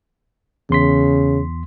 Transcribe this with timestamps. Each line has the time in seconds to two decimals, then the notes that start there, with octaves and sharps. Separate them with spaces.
0.70 E2 C#3 C6 B6